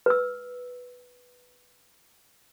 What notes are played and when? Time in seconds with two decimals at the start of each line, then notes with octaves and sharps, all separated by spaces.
0.06 B4 E6